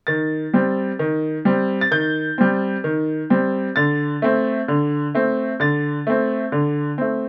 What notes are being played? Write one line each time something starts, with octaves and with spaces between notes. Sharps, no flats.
D#3 A6
G3 C4
D#3
G3 C4
A6
D#3 G6
G3 C4
D#3
G3 C4
D3 A6
A3 C4
D3
A3 C4
D3 A6
A3 C4
D3
A3 C4